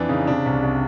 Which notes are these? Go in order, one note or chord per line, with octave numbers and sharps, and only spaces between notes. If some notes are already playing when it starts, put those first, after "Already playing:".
Already playing: F2 E3 D4 E4
C#3 D#4
C3 D4
C2
C2